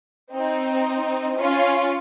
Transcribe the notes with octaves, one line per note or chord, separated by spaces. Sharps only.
C4 D#4
C#4 F4